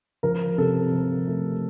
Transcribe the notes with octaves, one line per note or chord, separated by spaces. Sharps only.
F3 A#4
C3 A4
F3
A3